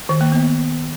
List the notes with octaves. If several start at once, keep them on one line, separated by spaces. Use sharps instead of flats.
D#3
A#3
B3